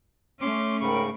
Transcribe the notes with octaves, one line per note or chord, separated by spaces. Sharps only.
A3 C#4 C6 D6
G#2 C#3 A#4 G5 B5 C#6